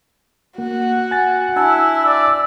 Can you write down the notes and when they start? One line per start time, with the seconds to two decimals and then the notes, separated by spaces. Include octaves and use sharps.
0.58 A#3 F#4 F#5
1.11 G#5 A6
1.56 D4 E4 G#5 A5 E6
2.05 D5